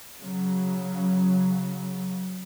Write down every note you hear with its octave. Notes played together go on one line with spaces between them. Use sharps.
C#3 F#3